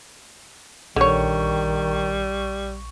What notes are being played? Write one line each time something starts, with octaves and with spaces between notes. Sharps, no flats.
A#1 D3 D#3 G3 C#5 C#6